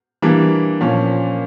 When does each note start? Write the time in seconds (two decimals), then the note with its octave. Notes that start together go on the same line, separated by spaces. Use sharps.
0.22 E3 G3 A#3 D4
0.81 A#2 F3 C#4